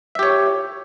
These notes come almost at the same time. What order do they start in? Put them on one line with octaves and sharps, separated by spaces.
E5 G4 C#5